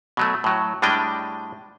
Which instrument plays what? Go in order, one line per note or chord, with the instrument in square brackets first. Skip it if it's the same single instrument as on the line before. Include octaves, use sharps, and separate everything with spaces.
[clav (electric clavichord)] B2 F#3 A3
A2 F#3
A2 G3 G#3 D4 D#5 G5